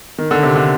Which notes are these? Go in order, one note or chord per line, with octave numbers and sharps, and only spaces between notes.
D#3
D3
C3
D3